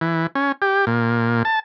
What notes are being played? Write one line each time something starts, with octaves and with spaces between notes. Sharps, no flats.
E3
C#4
G4
A#2
A5